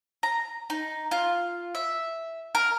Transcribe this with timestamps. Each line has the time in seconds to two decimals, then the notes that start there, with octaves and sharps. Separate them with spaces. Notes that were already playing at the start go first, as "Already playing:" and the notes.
0.23 A#5
0.70 D#4
1.11 F4
1.75 E5
2.55 A#4